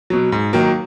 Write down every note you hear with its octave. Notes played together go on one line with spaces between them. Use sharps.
B2 F#3
G#2
D#3 F#3 A#3